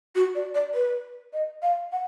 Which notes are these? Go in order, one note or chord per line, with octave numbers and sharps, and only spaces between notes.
F#4
D5
D5
B4
D#5
F5
F#5